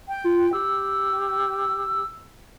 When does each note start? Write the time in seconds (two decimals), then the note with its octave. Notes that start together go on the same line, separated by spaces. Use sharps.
0.08 G5
0.24 F4
0.53 G4 E6